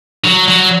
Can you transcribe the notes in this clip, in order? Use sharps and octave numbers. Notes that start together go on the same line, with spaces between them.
F#3
F#3